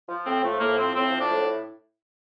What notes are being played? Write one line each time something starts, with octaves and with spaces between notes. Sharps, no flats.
F3
A2 C4
F3 A3
A2 A#3
F3 C4
A2 C4
F3
D4
A2